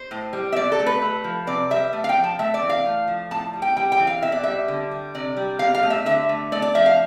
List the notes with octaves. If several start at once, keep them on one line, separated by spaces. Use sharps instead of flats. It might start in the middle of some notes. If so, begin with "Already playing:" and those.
Already playing: C5
A2
G3
E5
B2 D5
A4
A3
B4
A3
F3
C3 D5
G3 E5
A3
F5
G5
F3
A5
A3 E5
D5
E3
F5
A3
F3
A2 A5
G3
G5
G3 G5
G5
E3
F5
B2 E5
D5
G3 E5
D3
G3
C3 D5
G3
B2 F5
F5
A3
E5
D3 E5
A3
A3 D5
D5
F3 E5
F5